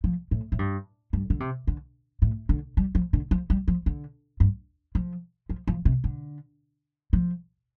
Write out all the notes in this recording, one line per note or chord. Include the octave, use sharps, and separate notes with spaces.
F3
A2
A2
G2
G2
D3
C3
D3
A2
D3
G3
F3
D3
F3
G3
F3
D3
G2
F3
F3
F3
C3
D3
F3